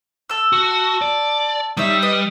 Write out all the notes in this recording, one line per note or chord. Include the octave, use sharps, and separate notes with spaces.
A4 E6
F#4
D5
G3 D#4 C#5 E5
B4 D#5